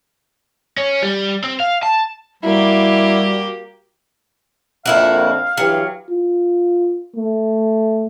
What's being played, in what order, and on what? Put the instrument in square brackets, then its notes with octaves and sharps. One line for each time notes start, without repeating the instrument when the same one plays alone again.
[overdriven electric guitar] C#4
G3
C4
F5
A5
[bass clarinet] G3 [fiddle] A#3 G4 [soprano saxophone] E4 [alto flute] F#4
[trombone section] A#1 F2 [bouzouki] A#3 E4 F#4 [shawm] F5
[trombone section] G2 E3 G4 [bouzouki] F#3
[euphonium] F4
A3